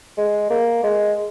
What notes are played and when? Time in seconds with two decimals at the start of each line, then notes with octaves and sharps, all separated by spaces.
0.18 G#3
0.50 A#3
0.84 G#3